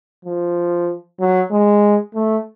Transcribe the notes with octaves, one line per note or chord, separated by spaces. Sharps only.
F3
F#3
G#3
A3